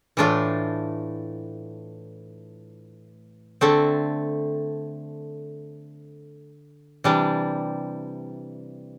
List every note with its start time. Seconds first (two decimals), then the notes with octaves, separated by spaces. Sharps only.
0.17 A2 E3 A3 D4 F4
3.61 D3 A3 C4
7.04 C3 E3 G3 D4